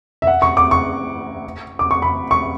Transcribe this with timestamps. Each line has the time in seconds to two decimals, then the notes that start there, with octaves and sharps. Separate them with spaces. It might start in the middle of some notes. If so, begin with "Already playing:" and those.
0.22 E5
0.27 F#5
0.42 C#6
0.57 D6
0.71 C#6
1.79 D6
1.91 C#6
2.02 B5
2.31 C#6